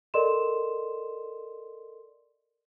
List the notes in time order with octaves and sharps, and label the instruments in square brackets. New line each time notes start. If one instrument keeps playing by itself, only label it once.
[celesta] A4 A#4 D5 D#5 C6 E7